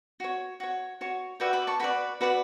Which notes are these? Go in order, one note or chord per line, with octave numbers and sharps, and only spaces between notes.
F#4 C#5
F#4 C#5
F#4 C#5
F#4 B4 D5 E5 G5
B5 D6
A5 C#6
F#4 B4 D5 G5 B5
F#4 B4 D5